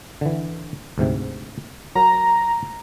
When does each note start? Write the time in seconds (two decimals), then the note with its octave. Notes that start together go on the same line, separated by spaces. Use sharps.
0.21 D3 E3
0.98 D2 G#2 C3
1.95 F#3 A#4 A#5